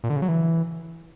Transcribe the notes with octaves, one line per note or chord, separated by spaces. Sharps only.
A#2
D3
C#3
F#3
E3